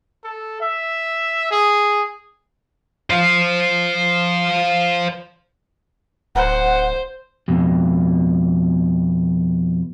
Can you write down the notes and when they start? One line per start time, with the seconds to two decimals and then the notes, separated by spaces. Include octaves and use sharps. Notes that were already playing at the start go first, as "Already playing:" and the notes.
0.24 A4
0.61 E5
1.51 G#4
3.10 C5 F5
6.35 D1 C5 F#5
7.48 F2 B2